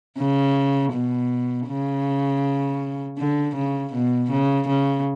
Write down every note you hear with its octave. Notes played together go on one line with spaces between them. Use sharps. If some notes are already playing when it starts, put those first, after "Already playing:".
C#3
B2
C#3
D3
C#3
B2
C#3
C#3